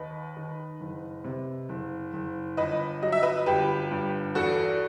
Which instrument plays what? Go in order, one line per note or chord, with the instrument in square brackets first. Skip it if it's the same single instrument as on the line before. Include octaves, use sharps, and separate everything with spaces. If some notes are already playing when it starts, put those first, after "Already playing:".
Already playing: [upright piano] D#2 B4 D#5
D#3
F#1
C3
F#1
F#1
G1 B4 D#5
F#3 D#5
E5
B4 D#5
G1 G4 B4
G2
E2 F#4 A4